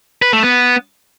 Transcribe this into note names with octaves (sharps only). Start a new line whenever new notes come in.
B4
A3
B3